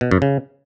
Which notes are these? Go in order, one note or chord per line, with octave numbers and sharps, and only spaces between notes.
B2
F#2
C#3